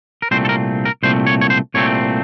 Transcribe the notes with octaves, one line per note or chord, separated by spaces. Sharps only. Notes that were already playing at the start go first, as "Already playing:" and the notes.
A#4
C2 A#2 A3 C4 C5
A4
A#4
A#4
C2 A#2 A3 C4 C5
C#5
C#5
C5
C2 A#2 A3 C4 C#5